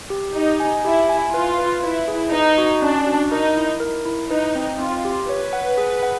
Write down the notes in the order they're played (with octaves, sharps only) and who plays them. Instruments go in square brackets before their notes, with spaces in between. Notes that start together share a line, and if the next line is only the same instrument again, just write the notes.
[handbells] G4
[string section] D#4 [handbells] G4
[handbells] G#5
[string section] E4 [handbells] G4
[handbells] G#5
[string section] F4 [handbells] B4
[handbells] B4
[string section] E4 [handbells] B4
[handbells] G#4
[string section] D#4 [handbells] B4
[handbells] F#4
[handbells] C#4 [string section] D4
[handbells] F#4
[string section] D#4 [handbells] A#4
[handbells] E4
A#4
E4
[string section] D#4 [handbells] B4
[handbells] C4
[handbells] C4 [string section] F4
[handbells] G4
[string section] B4 [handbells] C#5
[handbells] F#5
G#4
F#5